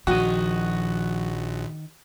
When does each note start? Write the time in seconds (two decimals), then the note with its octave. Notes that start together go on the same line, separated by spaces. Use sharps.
0.07 A#1 D#3 F3 F#4 D#5